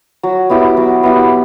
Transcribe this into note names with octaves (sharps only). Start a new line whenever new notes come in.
F#3
B3 E4 G4
F#3
B3 E4 G4